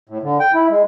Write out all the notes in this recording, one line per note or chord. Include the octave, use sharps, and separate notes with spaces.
A2
D3
G5
E4
G#3